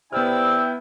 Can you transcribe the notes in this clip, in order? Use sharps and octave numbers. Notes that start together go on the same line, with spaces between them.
C3 B3 E4 D5 G5 E6 F6